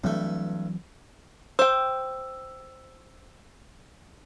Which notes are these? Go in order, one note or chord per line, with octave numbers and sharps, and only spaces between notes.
G2 E3 F#3 A3 C4
C5 G5 E6